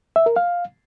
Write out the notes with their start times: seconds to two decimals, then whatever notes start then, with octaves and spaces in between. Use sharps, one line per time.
0.16 E5
0.26 A#4
0.36 F5